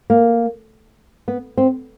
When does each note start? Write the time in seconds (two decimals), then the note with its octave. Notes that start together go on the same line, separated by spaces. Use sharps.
0.10 A#3
1.28 B3
1.57 C4